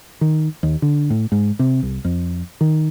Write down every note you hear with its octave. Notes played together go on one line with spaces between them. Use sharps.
D#3
D#2
D3
A2
G#2
C3
C2
F2
D#3